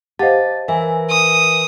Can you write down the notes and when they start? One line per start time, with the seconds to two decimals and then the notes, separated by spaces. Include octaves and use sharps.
0.19 G4 C5 D#5 F5 F#5 A5 A6
0.68 E3 A#4 E5 G#5
1.10 D#6